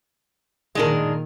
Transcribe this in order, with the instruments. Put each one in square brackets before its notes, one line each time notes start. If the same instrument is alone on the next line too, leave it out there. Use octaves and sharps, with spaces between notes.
[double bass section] A#2 D#3 [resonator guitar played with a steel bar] G#3 D4 A#4